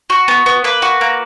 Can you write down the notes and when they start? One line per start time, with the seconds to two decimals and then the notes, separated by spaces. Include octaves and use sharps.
0.10 F#4
0.28 B3
0.46 B3
0.64 A#3 B4
0.82 F#4
1.01 A#3